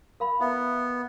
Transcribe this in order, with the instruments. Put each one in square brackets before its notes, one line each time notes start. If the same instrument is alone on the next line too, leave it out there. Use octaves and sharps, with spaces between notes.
[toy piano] A#4 F5 B5
[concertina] B3 [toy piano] E4 E5